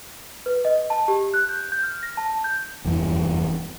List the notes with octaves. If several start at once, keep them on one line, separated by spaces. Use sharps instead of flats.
B4
D#5
A5
G4
F#6
G6
G6
F6
A#6
A5
G6
F1 E2 G2 E3